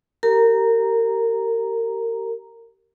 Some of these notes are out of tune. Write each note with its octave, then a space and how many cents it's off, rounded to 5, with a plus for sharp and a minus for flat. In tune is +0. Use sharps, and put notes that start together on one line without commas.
G4 -25 A#4 -30 A#5 +0